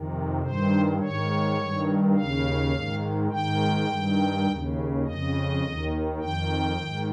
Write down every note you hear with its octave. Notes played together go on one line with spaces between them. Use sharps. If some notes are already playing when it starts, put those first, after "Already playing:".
Already playing: F2 C3 D#3
G2 D#3 C5
G#2 D#3 C#5
G2 D#3
D#2 C#3 F5
G#2 D#3
G#2 D#3 G5
G2 D#3
D#2 C#3
F2 C#3 D#5
D#2 D#3
F2 D#3 G5
D#3
G#2